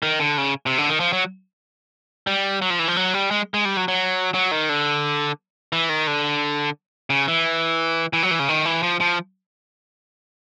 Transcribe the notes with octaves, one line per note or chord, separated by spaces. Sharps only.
D#3
D3
C#3
C3
D3
D#3
F3
F#3
G3
F#3
F3
E3
F3
F#3
G3
G#3
G#3
G3
F#3
F#3
F#3
D#3
D3
E3
D#3
D3
C#3
E3
E3
F#3
E3
C#3
D#3
E3
F3
F3